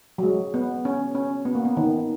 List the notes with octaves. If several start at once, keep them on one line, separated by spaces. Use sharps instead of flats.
F#3
G#3
B3
C#4
C#4
B3
A#3
B3
D#3